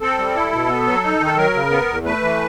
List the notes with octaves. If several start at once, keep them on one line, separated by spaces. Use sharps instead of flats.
C4 A4
G3
E4
B2
B3
F#3
D#4
D#3
A4
F#3 A#4
C#3
B3
E2
A3 B4
E3